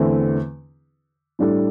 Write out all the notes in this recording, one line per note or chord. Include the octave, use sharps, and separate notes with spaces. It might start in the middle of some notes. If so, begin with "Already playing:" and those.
Already playing: E2 D3 A3 C4 E4
A2 G3 D4 A4